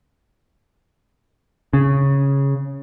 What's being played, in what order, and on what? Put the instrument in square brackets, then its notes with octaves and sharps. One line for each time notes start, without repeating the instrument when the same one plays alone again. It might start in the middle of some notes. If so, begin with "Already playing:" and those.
[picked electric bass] C#3